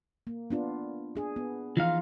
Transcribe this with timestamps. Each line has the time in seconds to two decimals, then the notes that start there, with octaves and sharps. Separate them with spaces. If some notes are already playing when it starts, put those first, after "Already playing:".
0.27 A#3
0.51 B3 D4 F4
1.16 D4 G#4
1.36 B3
1.77 E3 F3 D#4 F4 F5